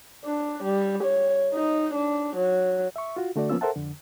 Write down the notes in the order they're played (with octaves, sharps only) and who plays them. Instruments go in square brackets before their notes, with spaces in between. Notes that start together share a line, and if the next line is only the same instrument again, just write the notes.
[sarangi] D4
G3
C#5
D#4
D4
F#3
[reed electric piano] E5 C#6
F4 F#4
D3 A3 F#4 D5
F3 A#3 B3 C#4 F4 E6
A4 A#4 C5 E5 F#5 A5
F2 D3